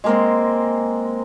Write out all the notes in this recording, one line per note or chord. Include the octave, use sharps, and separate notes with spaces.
G#3 A#3 C4